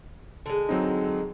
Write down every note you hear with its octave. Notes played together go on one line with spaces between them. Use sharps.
D3 G#3
F#3 C4 D#4